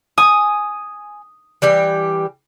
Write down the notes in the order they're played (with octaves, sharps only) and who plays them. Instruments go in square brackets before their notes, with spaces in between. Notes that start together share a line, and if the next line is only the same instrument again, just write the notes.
[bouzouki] G#5 [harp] D#6
[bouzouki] E3 G3 G4